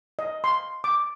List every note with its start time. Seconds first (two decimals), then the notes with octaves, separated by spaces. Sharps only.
0.19 D#5
0.44 C6
0.84 D6